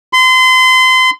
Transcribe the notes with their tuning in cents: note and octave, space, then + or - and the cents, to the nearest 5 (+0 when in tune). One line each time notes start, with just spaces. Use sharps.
C6 -30